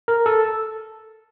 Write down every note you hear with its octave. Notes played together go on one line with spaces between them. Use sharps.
A#4
A4